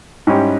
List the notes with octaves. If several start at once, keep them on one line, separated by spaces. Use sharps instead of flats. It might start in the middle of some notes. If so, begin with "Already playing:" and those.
G#2 G3 C#4 E4 G4